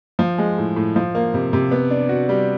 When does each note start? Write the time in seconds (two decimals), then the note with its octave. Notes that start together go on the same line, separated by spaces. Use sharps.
0.19 F3
0.38 G#3
0.58 A2
0.76 A2
0.96 F3
1.15 A#3
1.34 C3
1.53 C3
1.72 B3
1.90 D4
2.09 F#4
2.29 G3